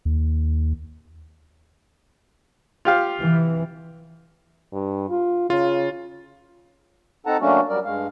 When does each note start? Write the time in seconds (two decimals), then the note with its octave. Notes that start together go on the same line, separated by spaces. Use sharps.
0.05 D#2
2.85 F4 G4 F5
3.21 C3 E3
4.73 G2
5.10 F4
5.50 C#3 F4
7.26 C4 D#4 A4 F#5 A5 A#5
7.40 F#3 A3 A#3 C#4 D4 F#4
7.69 F#3 G3 A#4 D5
7.85 G2 G#3 F5